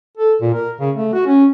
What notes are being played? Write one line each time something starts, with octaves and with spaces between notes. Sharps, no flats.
A4
A#2
A#4
C#3
A3
F#4
C#4